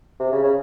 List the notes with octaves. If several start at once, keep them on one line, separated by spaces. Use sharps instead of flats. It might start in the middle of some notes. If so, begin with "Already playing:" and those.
C3
C#3
C#3